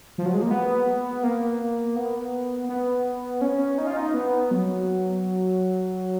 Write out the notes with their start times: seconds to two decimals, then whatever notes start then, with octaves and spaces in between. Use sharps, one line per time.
0.18 F3
0.26 F#3
0.34 G#3
0.42 A#3
0.50 B3
1.23 A#3
1.96 B3
2.69 B3
3.41 C#4
3.78 D#4
3.87 F4
3.97 D#4
4.14 B3
4.51 F#3